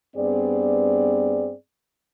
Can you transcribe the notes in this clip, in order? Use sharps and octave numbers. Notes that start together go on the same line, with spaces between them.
G2 B3 C4 G#4 D5